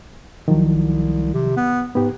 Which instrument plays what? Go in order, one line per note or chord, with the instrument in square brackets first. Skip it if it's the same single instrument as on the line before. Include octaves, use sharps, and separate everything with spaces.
[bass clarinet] C2 [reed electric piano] D#3 F3 F#3
[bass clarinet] C3
B3
[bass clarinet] G#2 [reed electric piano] B3 G4